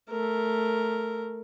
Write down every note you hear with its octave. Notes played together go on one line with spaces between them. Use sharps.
A3 A#4